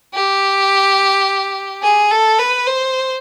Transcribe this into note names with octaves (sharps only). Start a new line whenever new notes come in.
G4
G#4
A4
B4
C5